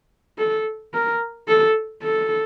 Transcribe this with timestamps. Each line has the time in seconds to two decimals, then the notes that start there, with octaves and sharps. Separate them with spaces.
0.39 A4
0.94 A#4
1.48 A4
2.03 A4